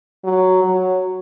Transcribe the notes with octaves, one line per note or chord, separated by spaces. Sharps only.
F#3
F#3